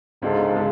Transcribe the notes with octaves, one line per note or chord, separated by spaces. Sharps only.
C#2 G#2 C#3 G#3 D4 A4
C#3 G#3 D4 A4